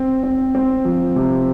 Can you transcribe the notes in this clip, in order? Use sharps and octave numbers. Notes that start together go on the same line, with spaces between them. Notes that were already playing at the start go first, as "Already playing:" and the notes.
Already playing: C4
C4
C4
F3
C3